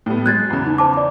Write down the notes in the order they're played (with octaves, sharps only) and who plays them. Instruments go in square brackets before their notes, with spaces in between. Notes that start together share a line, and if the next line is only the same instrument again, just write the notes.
[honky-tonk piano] A2 G3 B3
[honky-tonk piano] F#3 G#3 [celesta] F#6 G#6 A6
[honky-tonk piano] E2 C#3
[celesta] D#4
C5 A5 D6
D5 D6